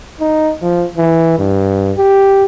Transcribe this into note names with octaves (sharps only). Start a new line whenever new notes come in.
D#4
F3
E3
G2
G4